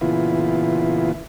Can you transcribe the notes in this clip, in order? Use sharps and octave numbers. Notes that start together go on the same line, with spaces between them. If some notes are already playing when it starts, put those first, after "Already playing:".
A#2 C#3 E3 B3 E4 F4